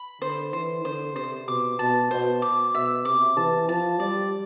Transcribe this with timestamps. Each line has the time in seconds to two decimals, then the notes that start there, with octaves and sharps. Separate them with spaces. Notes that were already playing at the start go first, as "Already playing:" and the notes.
Already playing: B5
0.21 D3 C5
0.53 E3 C5
0.85 D3 C5
1.16 C3 C5
1.48 B2 D6
1.79 B2 A5
2.11 B2 C5
2.42 D6
2.74 B2 E5
3.05 C3 D6
3.37 E3 A5
3.69 F3 A5
4.00 G3 D5